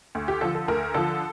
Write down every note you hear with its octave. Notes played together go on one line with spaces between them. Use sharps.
D2
G4
D3 F3 A4
A4
D2 A#4
D3 F3 A4